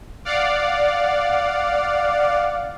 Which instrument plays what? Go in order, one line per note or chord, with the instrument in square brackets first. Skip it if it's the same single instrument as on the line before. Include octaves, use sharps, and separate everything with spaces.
[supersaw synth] D5 F5 F#5